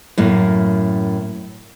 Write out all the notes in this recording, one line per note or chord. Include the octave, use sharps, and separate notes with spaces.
F#2 A2 A#3